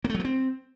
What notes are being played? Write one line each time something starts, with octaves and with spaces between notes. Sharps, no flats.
A#3
A3
F#3
A3
C4